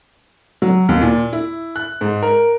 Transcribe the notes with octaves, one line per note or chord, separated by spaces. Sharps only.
F#3
D#2
A#2
E4
F#6
G#2
A#4